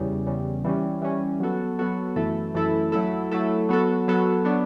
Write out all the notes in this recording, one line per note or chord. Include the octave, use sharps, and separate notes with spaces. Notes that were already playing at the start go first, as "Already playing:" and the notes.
Already playing: E2 C#3 G3
E2 C#3 G3
E3 G3 C#4
E3 G3 C#4
F#3 B3 F#4 A4
F#3 B3 F#4 A4
F#2 E3 A3 E4 A4
F#2 E3 A3 E4 A4
F#3 A3 E4 A4
F#3 A3 E4 A4
F#3 B3 F#4 A4
F#3 B3 F#4 A4
F#3 B3 D4